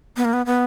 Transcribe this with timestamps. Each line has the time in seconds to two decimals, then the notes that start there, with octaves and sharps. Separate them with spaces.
0.17 B3
0.25 A#3
0.33 B3
0.46 B3